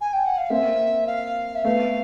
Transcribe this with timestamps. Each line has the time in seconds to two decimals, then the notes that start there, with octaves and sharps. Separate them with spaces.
0.00 G#5
0.13 G5
0.25 F#5
0.37 F5
0.50 A#3 C4 E5
1.07 F5
1.55 E5
1.64 A3 B3 F5